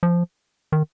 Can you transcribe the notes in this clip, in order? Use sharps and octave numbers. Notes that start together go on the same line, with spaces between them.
F3
D#3